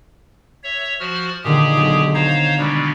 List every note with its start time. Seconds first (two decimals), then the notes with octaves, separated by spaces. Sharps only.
0.64 C#5 E5
1.00 F3 F#4 F6
1.44 A#2 D3 D#3 G4 G#4
1.77 B1
2.15 C5 C#5 F5 A#5
2.58 B2 G3 G#3 B3 D4